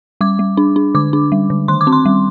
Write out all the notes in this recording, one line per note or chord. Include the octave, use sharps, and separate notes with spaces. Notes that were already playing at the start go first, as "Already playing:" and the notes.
G3 D6
G3
D4
D4
D3 D6
D4
G3
D3
D#3 C6
D6
C4
C6
G3